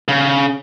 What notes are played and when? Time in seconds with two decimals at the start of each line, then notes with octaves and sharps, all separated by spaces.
0.08 C#3